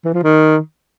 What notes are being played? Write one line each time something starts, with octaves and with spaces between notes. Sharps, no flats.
E3
F3
D#3